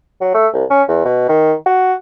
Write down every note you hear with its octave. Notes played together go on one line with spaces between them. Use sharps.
F#3
A3
C2
C#4
E2
B2
D#3
F#4